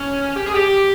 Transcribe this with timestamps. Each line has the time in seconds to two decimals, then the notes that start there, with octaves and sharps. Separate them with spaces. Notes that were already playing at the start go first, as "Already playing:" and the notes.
Already playing: C#4
0.36 G4
0.46 G#4
0.54 G4